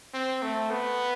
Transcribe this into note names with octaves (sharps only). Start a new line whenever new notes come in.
C4
A3
B3